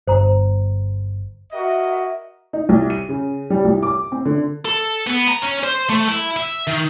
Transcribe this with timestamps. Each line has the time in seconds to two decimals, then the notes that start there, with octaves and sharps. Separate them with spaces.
0.07 G1 C5 A#5
1.52 F#4 A#4 D#5 E5
2.53 D#4
2.69 C2
2.90 D#7
3.09 C#3
3.50 G3
3.65 C2
3.83 D6
4.12 C4
4.25 D3
4.65 A4
5.07 B3
5.28 A#5
5.42 C#4
5.63 C5
5.90 A3
6.09 E4
6.37 E5
6.67 D#3